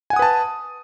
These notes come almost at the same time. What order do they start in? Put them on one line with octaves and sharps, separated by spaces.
G#5 F#5 D#6 B4 A5